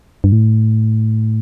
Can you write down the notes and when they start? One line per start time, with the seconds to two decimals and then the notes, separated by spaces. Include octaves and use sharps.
0.24 G2
0.32 A2